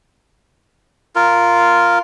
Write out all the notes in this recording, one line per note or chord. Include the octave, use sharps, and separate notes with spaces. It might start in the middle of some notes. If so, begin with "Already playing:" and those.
F4 A#4